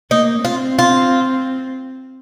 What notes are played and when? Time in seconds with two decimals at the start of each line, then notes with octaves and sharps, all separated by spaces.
0.11 A#3 D#4
0.45 C4 F4
0.79 F4